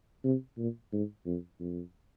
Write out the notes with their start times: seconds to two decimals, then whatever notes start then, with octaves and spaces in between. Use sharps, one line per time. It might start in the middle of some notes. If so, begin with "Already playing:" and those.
0.24 C3
0.58 A#2
0.93 G#2
1.26 F2
1.60 F2